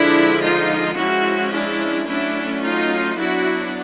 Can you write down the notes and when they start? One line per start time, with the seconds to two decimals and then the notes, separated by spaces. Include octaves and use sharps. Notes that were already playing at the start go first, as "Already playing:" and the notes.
Already playing: D3 F3 G#3 D4 E4
0.42 D#4 F4
0.97 F3 G#3 C#4 E4 F#4
1.52 D4 E4
2.07 F#3 A3 C#4 D4 E4
2.62 D#4 F4
3.18 F#3 B3 D4 E4 F#4